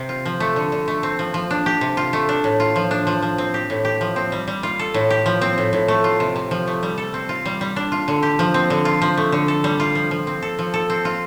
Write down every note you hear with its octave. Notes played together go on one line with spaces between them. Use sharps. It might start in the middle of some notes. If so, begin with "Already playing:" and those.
Already playing: C3 C4
F4
F3
A3
D3
D3
A3
C4
F3
F3
D4
G4
C3
F4
A3
D4
A2
F4
F3
D4
F3
F3
C4
G4
A2
G4
F3
C4
G3
G3
F4
A4
A2
G4
F3
C4
A2
A2
A3
F4
C3
C3
F3
A3
G3
A4
C4
F4
G3
G3
D4
F4
D3
G4
F3
C4
D3
F4
F3
A3
D3
A4
G3
F4
F3
F3
C4
A4
F3
A4
C4
F4